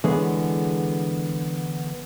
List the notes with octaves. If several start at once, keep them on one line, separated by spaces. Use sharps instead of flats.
D3 E3 G#3 B3 G#4 C#5